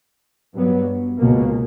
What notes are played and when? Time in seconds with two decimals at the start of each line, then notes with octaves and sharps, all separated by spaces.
0.55 G2 F#3 B3
1.19 C#2 B2 A#3